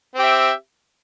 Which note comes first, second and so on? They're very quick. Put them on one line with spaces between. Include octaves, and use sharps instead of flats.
C4 G4 E5